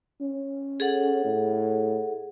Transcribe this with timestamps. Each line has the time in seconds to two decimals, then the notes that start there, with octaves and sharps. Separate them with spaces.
0.21 C#4
0.80 G#4 A4 F#5
1.25 A2